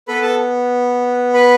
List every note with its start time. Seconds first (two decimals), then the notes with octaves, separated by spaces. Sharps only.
0.08 B3 A4 B4 B5
0.22 A4 A5
1.34 B4 B5